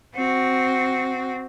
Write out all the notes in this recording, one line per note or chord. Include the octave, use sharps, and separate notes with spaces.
C4 F#4